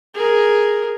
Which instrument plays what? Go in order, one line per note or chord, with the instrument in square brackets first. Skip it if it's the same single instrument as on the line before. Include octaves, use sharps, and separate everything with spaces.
[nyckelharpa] G#4 A#4